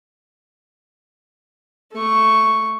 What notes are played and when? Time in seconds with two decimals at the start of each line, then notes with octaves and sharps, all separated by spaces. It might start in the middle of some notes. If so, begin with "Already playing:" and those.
1.93 A3 C#6